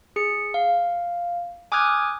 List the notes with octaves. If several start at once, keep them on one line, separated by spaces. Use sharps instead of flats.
G#4 C#7
F5
G#5 D6 D#6 F6 F#6 G#6